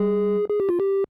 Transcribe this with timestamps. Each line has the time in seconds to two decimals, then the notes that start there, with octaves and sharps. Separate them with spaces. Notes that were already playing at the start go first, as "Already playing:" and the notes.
Already playing: G3 G#4
0.50 G#4
0.60 G4
0.69 F4
0.80 G4